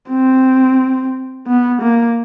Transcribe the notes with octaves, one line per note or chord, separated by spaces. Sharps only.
C4
B3
A#3